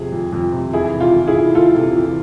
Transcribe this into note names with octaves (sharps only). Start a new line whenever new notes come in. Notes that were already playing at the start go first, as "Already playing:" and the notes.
Already playing: F2 C3 G#4
F2
F2
C3
E2 E4 G#4
C3
F4
E3
E4 G#4
E2
E2 F4 A4
C3
E2